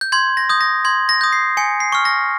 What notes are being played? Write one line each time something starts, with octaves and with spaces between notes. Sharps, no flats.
G6
C6 G#6
A#6
D#6 G6
A#6
C6 G#6
A#6
D#6 G6
C7
G#5 C#7
C7
C#6 F6
A#6